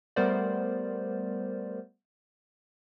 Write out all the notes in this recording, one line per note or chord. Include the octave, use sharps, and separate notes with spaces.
G3 A3 B3 A#4 C5 D5